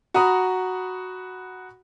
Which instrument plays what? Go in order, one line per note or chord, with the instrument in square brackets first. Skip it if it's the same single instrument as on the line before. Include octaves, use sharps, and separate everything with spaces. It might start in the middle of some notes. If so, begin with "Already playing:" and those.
[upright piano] F#4 F#5 A#5 B5 D#6